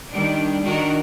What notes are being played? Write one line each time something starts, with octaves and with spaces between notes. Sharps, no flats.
D#3 G3 D4
D#3 D4 F#4 A#4